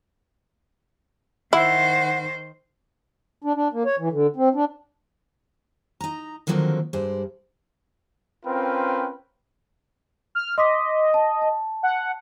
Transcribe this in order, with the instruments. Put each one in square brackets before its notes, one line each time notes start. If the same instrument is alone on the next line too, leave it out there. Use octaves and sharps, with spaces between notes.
[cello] D#3 C5 [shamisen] E4 [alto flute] F#5
[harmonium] D4
D4
A#3
C#5
E3
D3
C4
D4
[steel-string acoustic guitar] D#4 A#5
D3 D#3 F3 F#3 A#3 C4
G2 G#3 C5 D5
[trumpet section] C4 C#4 F4 A#4 B4 G5
[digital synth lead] F6
[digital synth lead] D#5 [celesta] C6 D6 B6
[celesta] A5
A5
[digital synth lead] F#5